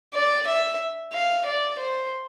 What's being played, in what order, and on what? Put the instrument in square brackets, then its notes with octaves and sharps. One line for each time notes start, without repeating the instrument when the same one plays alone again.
[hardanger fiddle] D5
E5
F5
D5
C5